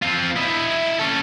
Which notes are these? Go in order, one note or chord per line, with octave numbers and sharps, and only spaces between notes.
C4 F4
E4 D#5
C#4 A4